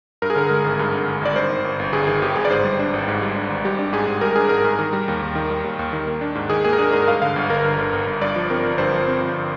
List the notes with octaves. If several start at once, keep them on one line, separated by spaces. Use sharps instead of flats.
G2 A#4
G#4
D3 A#4
G#3
G#1
G2
D3
G#3
G#1 D5
G2 C5
D#3
G1
G1
G2 G#4
D#3 G#4
G1 G4
G1 G#4
D5
G#2 C5
G3
D4
G#1
G#2
G3
D4
G#1
G3 G4
D4
G#2 G#4
G#2
G3 A#4
D4 G#4
G#2 A#4
G#2
D#3
G3
D#2
D#2
D#3
G3
D#2
D#2
D#3
A#3
D4
G#2
D#3 G#4
A#3 G#4
A#4
D4 G#4
G#2 A#4
G2 F5
D3 F5
G1
G1 A#4
G2
D3
G1
G1
G2 D5
F3
C4 A#4
G1
G2 C5
F3
C4
G1